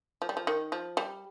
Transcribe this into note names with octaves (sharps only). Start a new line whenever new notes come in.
F3
G3
F3
D#3
F3
G3